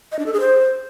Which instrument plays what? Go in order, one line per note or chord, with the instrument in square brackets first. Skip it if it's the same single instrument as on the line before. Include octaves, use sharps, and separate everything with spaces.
[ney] D#5
D4
A4
G#4
C5